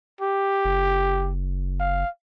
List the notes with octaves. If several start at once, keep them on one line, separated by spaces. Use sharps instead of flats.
G4
F#1
F5